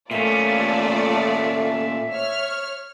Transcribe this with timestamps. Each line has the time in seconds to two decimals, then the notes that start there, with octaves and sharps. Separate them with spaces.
0.11 A#2 A3 C#4 F4 D5 E5
2.12 C#5 F6